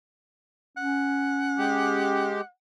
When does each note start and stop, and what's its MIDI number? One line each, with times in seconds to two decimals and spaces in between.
0.77 2.34 61
0.77 2.49 78
1.58 2.41 56
1.58 2.41 67